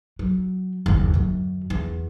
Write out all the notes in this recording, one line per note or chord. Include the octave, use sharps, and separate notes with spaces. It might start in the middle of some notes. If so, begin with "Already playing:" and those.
F#3
F#1 D#2
F#2 D3
E2